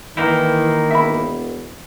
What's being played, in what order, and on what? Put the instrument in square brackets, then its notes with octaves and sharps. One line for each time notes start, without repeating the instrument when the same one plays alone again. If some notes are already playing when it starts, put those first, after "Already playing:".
[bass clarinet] D#3 [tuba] E3 [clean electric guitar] A#3 D#4 E4
[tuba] E1 [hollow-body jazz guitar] E5 B5